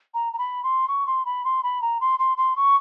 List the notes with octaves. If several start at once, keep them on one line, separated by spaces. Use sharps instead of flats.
A#5
A#5
B5
C6
C#6
C6
B5
C6
B5
A#5
C6
C6
C6
C#6